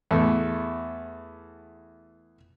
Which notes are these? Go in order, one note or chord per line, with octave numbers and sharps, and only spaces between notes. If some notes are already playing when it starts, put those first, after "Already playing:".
E2 A3